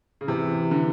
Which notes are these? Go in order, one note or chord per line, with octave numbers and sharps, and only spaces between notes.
C#3
C3 E3
D3